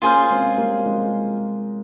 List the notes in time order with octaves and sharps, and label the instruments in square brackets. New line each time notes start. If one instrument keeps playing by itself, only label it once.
[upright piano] A#3 C#4 [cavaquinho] F4 G#4 C5 F5
[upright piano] G#3 C4
G3 A#3
F3 G#3